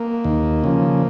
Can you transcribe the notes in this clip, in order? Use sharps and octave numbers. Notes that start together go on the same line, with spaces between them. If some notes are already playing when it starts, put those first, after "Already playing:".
Already playing: A#3
D#2
C#3 F3